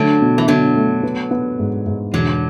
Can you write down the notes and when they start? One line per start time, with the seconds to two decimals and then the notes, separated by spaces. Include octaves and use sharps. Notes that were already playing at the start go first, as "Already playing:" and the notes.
Already playing: D3 F#3 A3
0.21 B2
0.38 E3
0.48 B2 D3 F#3
0.76 A3
1.03 B3
1.31 B3
1.59 G#2
1.86 G#2
2.13 E1 D3 F#3